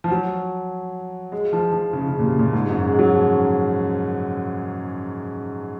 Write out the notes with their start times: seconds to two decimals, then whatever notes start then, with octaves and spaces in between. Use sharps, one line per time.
0.04 F3
0.11 F#3
1.32 G#3
1.53 F3
1.72 F3
1.93 C#3
2.08 C#3
2.19 A#2
2.24 C3
2.39 A#2
2.53 G#2
2.70 F#2
2.88 G#3
2.99 F#3
3.14 F3